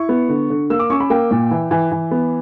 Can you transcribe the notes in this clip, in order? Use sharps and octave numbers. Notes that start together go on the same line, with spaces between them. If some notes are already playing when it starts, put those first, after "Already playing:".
Already playing: E4 C#6
B3
D3
D3
A#3 E6
D6
C#4 C#6
B5
A#3 G5
A#2
E3
E3
E3
B3